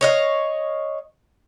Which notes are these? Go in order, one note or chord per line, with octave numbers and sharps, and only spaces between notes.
C#5 D#5 F5